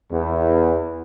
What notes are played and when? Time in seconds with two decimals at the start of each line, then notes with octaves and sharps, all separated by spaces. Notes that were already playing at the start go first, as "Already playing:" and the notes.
0.11 E2